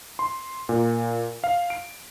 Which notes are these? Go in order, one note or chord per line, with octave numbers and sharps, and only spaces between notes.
C6
A#2
F5
D7